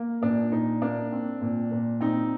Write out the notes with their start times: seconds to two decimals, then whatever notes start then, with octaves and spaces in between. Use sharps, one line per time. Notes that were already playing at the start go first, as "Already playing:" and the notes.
Already playing: A#3
0.22 A#2 D4
0.52 A#2 D#4
0.82 A#3 D4
1.12 C4
1.41 A#2
1.71 A#2
2.01 C4 D#4